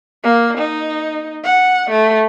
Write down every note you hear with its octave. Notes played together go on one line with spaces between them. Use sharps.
A#3
D#4
F#5
A3